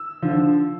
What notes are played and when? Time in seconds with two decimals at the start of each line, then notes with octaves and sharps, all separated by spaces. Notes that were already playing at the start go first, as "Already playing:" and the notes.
Already playing: E6
0.22 D3 F3